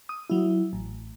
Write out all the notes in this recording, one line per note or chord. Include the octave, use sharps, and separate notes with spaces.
D#6
F#3 E4
A1